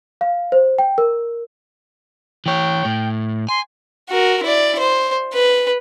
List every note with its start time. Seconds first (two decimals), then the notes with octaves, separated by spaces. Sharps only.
0.21 F5
0.52 C5
0.79 G5
0.98 A#4
2.46 E3 C#5 G5
2.85 A2
3.49 G#5 C6
4.10 F#4 A#4
4.43 E4 D5
4.79 C5
5.33 B4